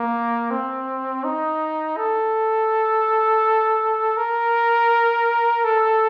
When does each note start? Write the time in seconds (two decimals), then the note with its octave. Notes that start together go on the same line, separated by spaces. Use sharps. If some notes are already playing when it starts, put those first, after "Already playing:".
Already playing: A#3
0.51 C4
1.24 D#4
1.97 A4
4.17 A#4
5.64 A4